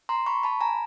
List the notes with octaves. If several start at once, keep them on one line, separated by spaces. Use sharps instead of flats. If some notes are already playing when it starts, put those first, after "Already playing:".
A#5 C6
B5 C#6
A5 B5
G#5 A#5